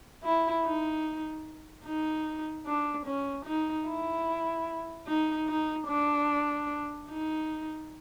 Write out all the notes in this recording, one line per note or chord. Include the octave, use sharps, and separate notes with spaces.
E4
D#4
D#4
D4
C#4
D#4
E4
D#4
D#4
D4
D#4